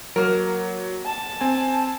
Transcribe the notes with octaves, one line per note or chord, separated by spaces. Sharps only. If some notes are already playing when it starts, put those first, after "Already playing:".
F#3 A#3 A#4
A5
C4 G#5